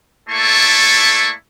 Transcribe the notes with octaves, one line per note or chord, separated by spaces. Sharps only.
A3 A#3 E4 A4 D5 C#6